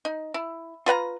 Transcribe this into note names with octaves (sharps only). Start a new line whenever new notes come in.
D#4
E4
F4 B4 F#5 A#5